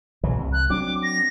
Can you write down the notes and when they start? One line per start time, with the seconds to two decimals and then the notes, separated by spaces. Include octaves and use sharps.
0.24 B1 E3 F#3
0.36 D#1 C2
0.53 F#6
0.70 F#3 C4 D4 D6
1.03 A#6